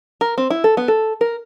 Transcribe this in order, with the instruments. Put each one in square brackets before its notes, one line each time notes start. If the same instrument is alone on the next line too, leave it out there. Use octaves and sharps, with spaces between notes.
[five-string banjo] A#4
C4
E4
A4
B3
A4
A#4